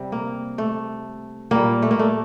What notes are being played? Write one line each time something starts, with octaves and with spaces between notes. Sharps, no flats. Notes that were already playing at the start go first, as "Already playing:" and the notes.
Already playing: C3 G3
A#3
A3
A#2 G3 A#3
A3
A#3
A3